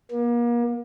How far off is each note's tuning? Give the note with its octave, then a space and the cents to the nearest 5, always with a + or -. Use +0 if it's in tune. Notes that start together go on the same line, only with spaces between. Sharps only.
A#3 +35